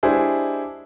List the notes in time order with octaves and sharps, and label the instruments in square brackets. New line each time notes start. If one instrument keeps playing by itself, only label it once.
[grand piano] G#3 D4 E4 G4 G#4 C5